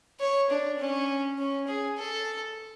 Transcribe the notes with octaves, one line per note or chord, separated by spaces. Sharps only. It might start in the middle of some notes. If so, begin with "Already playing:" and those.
C#5
D4
C#4
C#4
G#4
A4